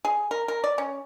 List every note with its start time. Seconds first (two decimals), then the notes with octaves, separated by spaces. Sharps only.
0.05 G#4
0.31 A#4
0.48 A#4
0.64 D5
0.78 C#4